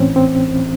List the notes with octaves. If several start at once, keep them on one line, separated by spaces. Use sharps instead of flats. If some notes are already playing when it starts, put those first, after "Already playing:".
Already playing: A2 E3 C4 C#4
C4